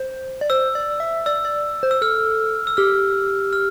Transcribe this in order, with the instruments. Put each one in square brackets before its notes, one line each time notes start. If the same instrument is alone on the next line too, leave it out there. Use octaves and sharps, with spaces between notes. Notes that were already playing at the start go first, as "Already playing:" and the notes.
Already playing: [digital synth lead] C5
D5
[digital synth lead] C5 [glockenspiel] E6
[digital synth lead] D5
E5
[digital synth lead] D5 [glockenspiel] E6
[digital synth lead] D5
C5
[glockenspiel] E6
[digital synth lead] A4 [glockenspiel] F6
[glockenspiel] E6
[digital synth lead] G4 [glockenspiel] F6
[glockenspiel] F6